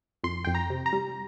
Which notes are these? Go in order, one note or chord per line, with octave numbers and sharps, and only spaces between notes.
F2 C6
F2 G5
A#5
C3
A#5
G3